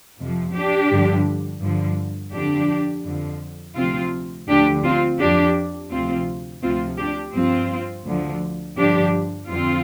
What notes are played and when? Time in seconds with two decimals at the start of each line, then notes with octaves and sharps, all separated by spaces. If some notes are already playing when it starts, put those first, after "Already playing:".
0.18 F2 C3 F3
0.54 D4 G4
0.89 G2 D3 F3
1.61 G2 D3 F3
2.32 F2 D3 F3 D4 G4
3.04 F2 D3 F3
3.76 D2 C3 F3 C4 F4
4.48 D2 D3 F3 D4 G4
4.83 C4 F4
5.19 F2 F3 D4 G4
5.91 D2 C3 F3 C4 F4
6.62 D2 C3 F3 C4 F4
6.98 D4 G4
7.34 G2 F3 C4 F4
8.06 D2 D3 F3
8.77 G2 D3 F3 D4 G4
9.49 F2 D3 F3 C4 F4